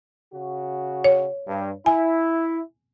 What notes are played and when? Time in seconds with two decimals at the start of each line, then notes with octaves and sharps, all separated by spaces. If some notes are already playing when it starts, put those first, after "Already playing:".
0.33 C#3 F#4
1.04 C#5
1.48 G2
1.86 E4 G#5